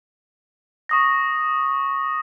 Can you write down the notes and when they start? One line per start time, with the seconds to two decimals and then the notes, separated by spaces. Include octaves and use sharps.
0.89 C#6 D#6 A#6